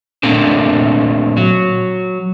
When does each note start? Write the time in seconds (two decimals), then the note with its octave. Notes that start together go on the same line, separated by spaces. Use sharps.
0.23 A#2 A3 A#3 C4 D4
1.37 F#3